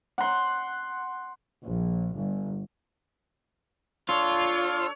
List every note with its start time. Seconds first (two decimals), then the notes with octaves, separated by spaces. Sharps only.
0.18 F#5 C6
1.64 A#1
2.15 G1
4.09 D4 F4 A4 C#5